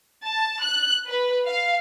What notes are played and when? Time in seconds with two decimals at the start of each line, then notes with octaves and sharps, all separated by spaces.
0.24 A5
0.61 F#6
1.06 B4
1.47 F5